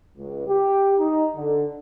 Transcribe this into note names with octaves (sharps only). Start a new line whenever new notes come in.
C#2
G4
D#4
D3